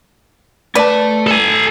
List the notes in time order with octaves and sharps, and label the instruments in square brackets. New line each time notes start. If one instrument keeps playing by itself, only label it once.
[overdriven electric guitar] A3 A5 [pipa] B4 D5
[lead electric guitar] A4 G#5